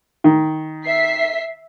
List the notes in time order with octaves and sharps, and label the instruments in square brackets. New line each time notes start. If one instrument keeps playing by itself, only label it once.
[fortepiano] D#3
[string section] E5 B6 C7